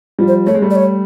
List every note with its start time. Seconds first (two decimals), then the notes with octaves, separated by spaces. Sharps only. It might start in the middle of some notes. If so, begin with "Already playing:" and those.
0.19 F3 G3
0.28 C5
0.47 A3 C#5
0.55 G#3
0.62 G3 A3
0.71 D5
0.75 C#5